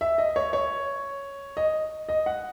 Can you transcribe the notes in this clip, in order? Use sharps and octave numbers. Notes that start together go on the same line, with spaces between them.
E5
D#5
C#5
C#5
D#5
D#5
F#5